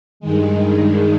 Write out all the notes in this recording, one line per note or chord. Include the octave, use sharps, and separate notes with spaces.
G2 D#3 G#3